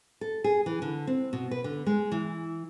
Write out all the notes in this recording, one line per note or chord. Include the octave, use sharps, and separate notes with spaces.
A4
G#4
E3
D3
C4
B2
B4
D3
G#3
E3